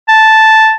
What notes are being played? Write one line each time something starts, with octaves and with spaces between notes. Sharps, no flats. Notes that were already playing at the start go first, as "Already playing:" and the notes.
A5